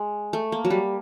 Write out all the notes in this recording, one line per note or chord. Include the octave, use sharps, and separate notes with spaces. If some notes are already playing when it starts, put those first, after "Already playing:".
Already playing: G#3
A3
A#3
F#3
G3